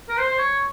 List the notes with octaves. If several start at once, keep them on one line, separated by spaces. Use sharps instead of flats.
A#4
C5
C5
C#5